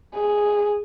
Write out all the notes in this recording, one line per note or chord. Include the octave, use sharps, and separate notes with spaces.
G#4